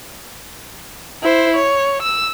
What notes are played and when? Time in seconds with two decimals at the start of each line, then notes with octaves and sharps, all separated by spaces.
1.23 E4 C5
1.56 C#5
2.02 E6